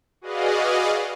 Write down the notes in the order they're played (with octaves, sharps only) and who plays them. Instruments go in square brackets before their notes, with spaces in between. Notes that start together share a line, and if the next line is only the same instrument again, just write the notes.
[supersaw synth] F#4 G#4 B4 D5 D#5 F5